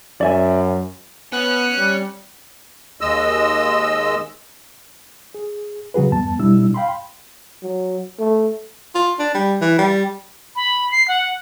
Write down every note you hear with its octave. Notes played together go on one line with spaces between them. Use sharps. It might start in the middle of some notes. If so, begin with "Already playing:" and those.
F#2 D5 E5 G#5
B3 C#4 F#6
G3
D#2 G#3 D#5 E6
G#4
C#3 F#3 F#4 G#4 B4
E2 G2 B3 A5
B2 G3 D4 E4 E6
F5 G5 B5 C6
F#3
A3
F4
D4
G3
E3
G3
B5
C7
F#5